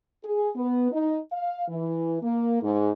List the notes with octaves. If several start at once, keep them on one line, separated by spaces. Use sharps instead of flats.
G#4
B3
D#4
F5
E3
A#3
G#2